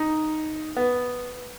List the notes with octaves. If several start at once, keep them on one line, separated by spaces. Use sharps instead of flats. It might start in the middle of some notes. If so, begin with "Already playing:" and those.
Already playing: D#4
B3